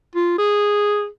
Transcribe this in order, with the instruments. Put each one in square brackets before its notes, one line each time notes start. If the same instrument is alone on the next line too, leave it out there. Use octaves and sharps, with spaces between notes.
[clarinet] F4
G#4